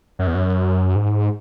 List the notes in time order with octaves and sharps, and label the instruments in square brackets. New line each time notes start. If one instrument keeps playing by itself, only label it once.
[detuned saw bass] F#2
E2
F#2
G#2